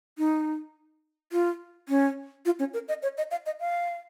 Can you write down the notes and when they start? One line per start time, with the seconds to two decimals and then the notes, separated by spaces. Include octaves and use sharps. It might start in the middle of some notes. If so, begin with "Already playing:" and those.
0.18 D#4
1.32 F4
1.89 C#4
2.46 F4
2.59 C#4
2.74 A#4
2.88 D#5
3.03 C#5
3.18 D#5
3.31 F5
3.46 D#5
3.60 F5